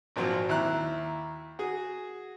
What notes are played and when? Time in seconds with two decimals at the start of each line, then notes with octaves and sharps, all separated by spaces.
0.16 G#1 A#2 F3 F#3
0.49 D#2 E4 A#5 F#6
1.59 F#4 G#4